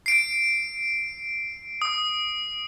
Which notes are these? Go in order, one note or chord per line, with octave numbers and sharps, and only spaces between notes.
C7 D7
D#6